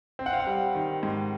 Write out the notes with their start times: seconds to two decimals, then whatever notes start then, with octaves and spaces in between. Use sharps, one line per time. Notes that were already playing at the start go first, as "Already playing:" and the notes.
0.19 C4
0.26 F#5
0.33 F5
0.40 F#5
0.47 G3
0.75 D#3
1.03 G#2